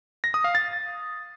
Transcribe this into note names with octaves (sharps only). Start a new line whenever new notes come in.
A#6
D#6
F5
A6